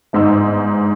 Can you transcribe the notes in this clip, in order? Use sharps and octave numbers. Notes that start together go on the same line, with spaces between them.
G1 G#2 D#4 E6